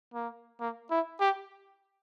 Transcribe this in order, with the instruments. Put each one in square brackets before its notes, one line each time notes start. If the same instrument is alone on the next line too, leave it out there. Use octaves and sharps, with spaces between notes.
[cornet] A#3
A#3
E4
G4